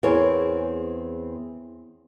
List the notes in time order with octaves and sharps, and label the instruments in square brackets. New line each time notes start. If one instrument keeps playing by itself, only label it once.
[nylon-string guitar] E2 C4 G#4 A#4 C#5